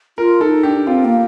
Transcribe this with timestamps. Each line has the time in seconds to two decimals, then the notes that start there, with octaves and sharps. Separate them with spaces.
0.18 F4 A#4
0.41 D#4 A4
0.63 D4 G4
0.87 C4 F4
1.05 A#3